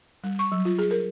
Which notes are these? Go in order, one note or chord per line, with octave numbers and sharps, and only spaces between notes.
G3
C#6
F#3
F4
G#4
A#4